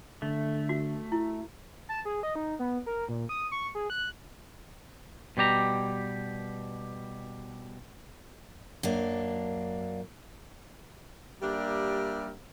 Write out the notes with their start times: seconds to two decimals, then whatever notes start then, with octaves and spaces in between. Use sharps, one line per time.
0.22 D3 A3
0.69 F#4
1.12 E4
1.89 A5
2.05 G#4
2.23 D#5
2.35 D#4
2.59 B3
2.86 A#4
3.09 A#2
3.29 D#6
3.52 C#6
3.75 G#4
3.90 F#6
5.37 B2 G3 G4 A#5
8.83 F#2 A#3 D4
11.42 G3 A#3 D4 G4 A#4 E5